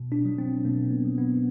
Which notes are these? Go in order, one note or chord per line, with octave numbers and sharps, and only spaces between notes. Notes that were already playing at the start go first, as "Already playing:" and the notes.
Already playing: B2
D4
F#3
C4
B2 A#3
B3
F#3
B3